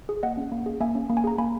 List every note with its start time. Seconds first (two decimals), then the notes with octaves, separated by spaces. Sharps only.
0.09 G#4
0.23 A#3 D#5 F#5
0.37 C#4
0.52 A#3
0.66 G#4
0.81 A#3 E5 G#5
0.95 C#4
1.10 A#3
1.17 G#5
1.24 G#4 A#5
1.38 A#3 G#5 B5